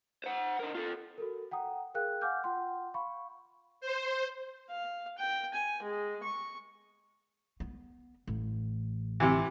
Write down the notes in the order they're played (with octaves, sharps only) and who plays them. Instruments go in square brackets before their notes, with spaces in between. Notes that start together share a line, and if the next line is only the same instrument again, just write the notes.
[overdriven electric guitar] C5 F#5
D3 A#4
F4 A4
[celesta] F#4 A4 A#4
F#5 G5 A#5 D#6
G#4 A#4 F5 G5 F#6
F5 F#5 G#5 D6 F6 G6
F4 F#5 G5 C6
F5 B5 C#6
[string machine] C5
[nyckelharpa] F5
G5
G#5
G#3
C#6
[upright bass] B3
A1
[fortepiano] C3 E3